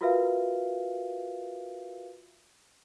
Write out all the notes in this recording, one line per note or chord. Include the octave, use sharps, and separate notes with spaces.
F4 F#4 A#4 B4 E5 F5